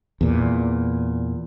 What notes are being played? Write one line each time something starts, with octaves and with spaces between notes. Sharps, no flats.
E2 A#2